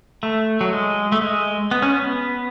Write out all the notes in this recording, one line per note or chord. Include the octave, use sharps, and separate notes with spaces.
A3
F#3
G#3
A3
G#3
B3
C#4
B3